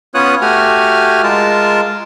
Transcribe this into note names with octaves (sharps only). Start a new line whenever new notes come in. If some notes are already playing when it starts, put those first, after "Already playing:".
B3 C#4 F4 C#5 D#6 F#6
A3 F#4 G4 G#5 F6
G#3 F4 A#4 A5